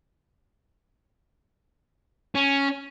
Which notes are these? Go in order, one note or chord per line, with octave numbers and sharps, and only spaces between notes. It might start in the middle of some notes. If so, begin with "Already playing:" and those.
C#4